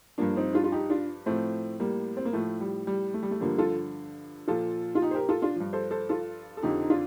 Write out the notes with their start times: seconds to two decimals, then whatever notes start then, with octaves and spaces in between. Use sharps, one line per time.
0.18 G2 F3 A#3 D4
0.36 C4 D#4
0.54 D4 F4
0.64 F4
0.72 D#4 G4
0.90 D4 F4
1.26 A2 F3 A3 C4
1.80 G3 A#3
2.17 C4
2.25 A#3
2.33 A2 F3 A3
2.61 G3
2.87 G3
3.14 A3
3.23 G3
3.31 A3
3.40 G2 D3 F3 G3 A#3
3.58 F4 A4
4.48 A#2 F3 F4 A4
4.95 F4
5.02 D#4 G4
5.11 C5
5.15 G4 A#4
5.29 F4 A4
5.42 D4 F4
5.56 G2 F3
5.73 A4 C5
5.91 A4 C5
6.09 F4 A4
6.57 A4
6.63 F2 D3 F3 D#4 G4
6.82 D#4
6.90 D4 F4